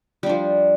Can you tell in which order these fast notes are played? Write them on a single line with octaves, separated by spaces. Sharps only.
G3 D4 F3